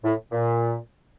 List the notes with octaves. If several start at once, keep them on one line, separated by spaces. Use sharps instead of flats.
A2
A#2